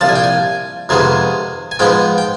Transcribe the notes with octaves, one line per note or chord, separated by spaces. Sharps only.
C2 A#2 F3 A5
G#5
G5
G#5
F2 C3 D#3 G#3 B3 G#5
G#5
G#2 F3 G#3 B3 G5
G5